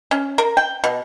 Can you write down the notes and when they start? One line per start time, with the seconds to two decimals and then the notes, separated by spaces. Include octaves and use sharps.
0.11 C#4
0.38 A#4
0.57 G5
0.84 B2